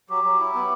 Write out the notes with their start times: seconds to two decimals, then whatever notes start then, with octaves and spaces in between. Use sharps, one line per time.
0.09 F#3 G4
0.24 F#3
0.40 E4
0.54 B3